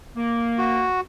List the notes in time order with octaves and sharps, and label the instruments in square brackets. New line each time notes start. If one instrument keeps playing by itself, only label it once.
[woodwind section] A#3
[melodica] F#4